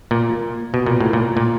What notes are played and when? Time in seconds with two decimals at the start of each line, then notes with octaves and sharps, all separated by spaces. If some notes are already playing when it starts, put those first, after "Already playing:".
0.11 A#2
0.74 B2
0.86 A#2
1.00 A2
1.13 A#2
1.37 A#2